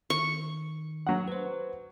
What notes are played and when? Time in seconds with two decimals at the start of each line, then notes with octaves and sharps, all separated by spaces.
0.10 D#3 C#6
1.07 F#3 F#5
1.28 B4 C5